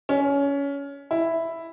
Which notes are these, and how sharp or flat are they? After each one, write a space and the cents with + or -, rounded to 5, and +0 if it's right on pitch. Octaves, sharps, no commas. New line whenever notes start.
C#4 +20
E4 +0